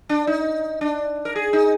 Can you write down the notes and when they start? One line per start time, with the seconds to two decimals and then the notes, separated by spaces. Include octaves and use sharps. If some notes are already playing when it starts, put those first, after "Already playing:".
0.09 D4
0.27 D#4
0.81 D4
1.25 A#4
1.35 G#4
1.53 D#4